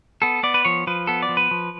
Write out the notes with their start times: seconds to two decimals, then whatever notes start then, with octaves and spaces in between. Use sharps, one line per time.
0.22 B3 A4
0.43 B3 D5
0.54 B4
0.65 F3 C#5
0.87 F3 B4
1.07 B3 A4
1.22 D5
1.29 F3
1.37 B4
1.51 F3